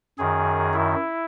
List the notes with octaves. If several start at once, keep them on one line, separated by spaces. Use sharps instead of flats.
F#2 D#3 G#4
E4